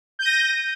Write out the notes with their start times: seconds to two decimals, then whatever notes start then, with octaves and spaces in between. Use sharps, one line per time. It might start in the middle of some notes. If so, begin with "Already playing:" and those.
0.19 G6
0.22 D#7
0.25 A#6